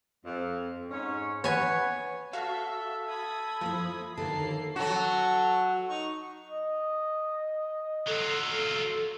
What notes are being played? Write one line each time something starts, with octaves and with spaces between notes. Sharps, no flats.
F2
G#2 C#4 C#5
B3 B4 C#5 F#5 G#5
F#4 A4 E5 F5
B5 D#6 G#6
F3 A#3 E4
D#2 D3 E3 A#3 A4 A5 C7
F#3 F#4 A4 C#6
D#4 C#6
D#5
F#3 F4 A4